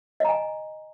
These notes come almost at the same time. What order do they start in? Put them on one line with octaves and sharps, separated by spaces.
D#5 A#5 G#5